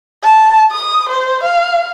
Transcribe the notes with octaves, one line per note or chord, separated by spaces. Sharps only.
A5
D#6
C5
F5